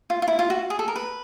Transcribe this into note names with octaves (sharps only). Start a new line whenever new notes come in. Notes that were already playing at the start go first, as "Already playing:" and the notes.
F4
F4
E4
F4
F#4
G#4
A4
A#4
B4